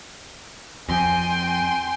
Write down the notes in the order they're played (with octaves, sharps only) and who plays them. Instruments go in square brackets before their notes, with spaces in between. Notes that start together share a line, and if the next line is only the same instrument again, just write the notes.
[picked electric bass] F2 [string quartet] G5 C6 [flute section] G#5